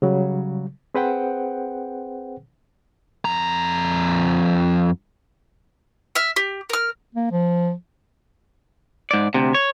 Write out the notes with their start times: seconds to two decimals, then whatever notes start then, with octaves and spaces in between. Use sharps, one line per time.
0.02 C#3 F#3 G3
0.95 C4 G#4 B4 C5 F#5 G5
3.25 F2 A#5
6.15 E5 F6
6.36 G4
6.70 A#4 F6
7.15 A#3
7.32 F3
9.11 G#2 D5
9.34 D2 C3
9.54 C#5